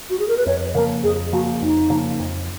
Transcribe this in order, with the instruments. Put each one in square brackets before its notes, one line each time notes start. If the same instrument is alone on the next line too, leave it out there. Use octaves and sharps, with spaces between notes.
[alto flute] F#4
G#4
A#4
B4
[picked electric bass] F2 [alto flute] C#5
[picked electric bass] C#3 F3 A#3 [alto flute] A#4
[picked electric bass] F2 [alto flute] G#4
[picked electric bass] C#3 F3 A#3 [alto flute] F#4
[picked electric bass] F2 [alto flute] D#4
[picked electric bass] C#3 F3 A#3
F2